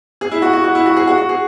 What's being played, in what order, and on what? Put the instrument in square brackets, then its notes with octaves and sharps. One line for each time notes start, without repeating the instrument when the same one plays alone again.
[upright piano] G#4
E4
F#4
F#4
F#4
E4
F#4
G#4
F#4
F#4
G#4